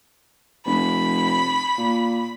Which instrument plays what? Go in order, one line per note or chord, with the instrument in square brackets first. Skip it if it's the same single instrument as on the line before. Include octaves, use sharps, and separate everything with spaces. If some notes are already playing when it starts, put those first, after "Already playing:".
[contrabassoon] F1 [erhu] B5
[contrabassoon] A#2